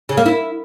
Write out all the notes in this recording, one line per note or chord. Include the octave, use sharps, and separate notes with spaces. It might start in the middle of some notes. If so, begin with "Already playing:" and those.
C#3
A#3
E4